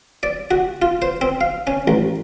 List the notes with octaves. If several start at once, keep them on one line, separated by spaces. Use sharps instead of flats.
D5
F#4
F4
C5
C4
F5
C#4
A1